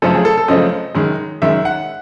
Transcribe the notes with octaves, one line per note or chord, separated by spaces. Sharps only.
F#2 C#3 F3 A3 C4 A4
G#4
A4
A4
F#2 C#3 F3 A3 C4 D#5
F#2 D#3 G#3
F#2 D#3 G#3 E5
F#5